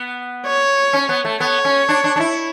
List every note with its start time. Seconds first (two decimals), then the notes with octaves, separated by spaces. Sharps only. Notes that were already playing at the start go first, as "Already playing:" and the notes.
Already playing: B3
0.46 C#5
0.93 C#4
1.09 B3
1.25 A3
1.40 B3 C#5
1.65 C#4
1.89 D4
2.04 D4
2.16 D4
2.20 E4